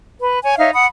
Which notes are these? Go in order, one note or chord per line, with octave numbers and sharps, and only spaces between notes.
B4
C#5 G#5
D#4 C#5 E5 F5
F#5 B5 D#6